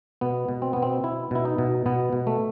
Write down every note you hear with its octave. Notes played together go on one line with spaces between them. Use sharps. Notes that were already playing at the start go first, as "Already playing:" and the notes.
B2 B3
B2
C4
B2 B3
C4
B2 E4
B2 E4
D#4
B2
B2 B3
B2
A3